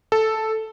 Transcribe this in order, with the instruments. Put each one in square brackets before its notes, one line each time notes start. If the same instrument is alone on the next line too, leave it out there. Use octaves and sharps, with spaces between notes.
[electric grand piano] A4